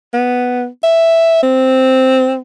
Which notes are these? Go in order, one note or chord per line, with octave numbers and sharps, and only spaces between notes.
B3
E5
C4